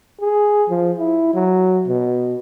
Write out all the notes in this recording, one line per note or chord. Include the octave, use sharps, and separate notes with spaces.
G#4
F3
E4
F#3
B2